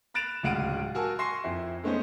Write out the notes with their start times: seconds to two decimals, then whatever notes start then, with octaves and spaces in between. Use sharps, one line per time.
0.14 B5 F#6 A6 D7 E7 F7
0.43 D1 C#2 F5 F#5 D7 D#7
0.95 F#4 A#4 G#5 A5 E6
1.19 G#5 C6 C#6 A#6 C7 E7
1.44 F2 E4
1.83 G#3 A3 B3 C#4 D#4 C5